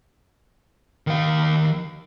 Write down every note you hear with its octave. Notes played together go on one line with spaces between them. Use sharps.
D#3 F5